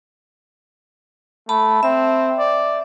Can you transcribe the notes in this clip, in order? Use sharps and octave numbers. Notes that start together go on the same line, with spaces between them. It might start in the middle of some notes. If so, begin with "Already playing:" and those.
A3 A5 B5
C4 E5
D5